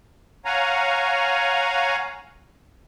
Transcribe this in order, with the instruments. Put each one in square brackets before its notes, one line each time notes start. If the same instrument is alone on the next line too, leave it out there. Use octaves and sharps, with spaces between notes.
[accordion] C#5 F5 F#5 G#5 A#5